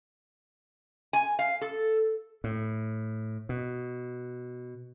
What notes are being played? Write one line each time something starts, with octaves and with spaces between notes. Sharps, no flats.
G#5
F5
A4
A2
B2